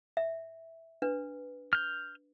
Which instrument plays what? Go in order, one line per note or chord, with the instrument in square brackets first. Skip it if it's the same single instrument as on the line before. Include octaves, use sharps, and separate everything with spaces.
[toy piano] E5
D4 B4
[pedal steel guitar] F6 G6